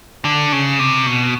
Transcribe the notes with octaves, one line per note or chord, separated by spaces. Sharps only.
D3
C#3
C3
B2